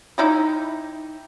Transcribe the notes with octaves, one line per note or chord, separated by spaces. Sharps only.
D#4 E4 G4